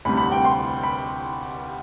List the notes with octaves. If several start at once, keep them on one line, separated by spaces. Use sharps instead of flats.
D2 C3 G3 B5
B5
G5
C6
B5